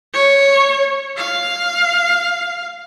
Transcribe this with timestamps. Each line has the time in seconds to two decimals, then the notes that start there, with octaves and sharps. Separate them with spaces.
0.13 C#5
1.17 F5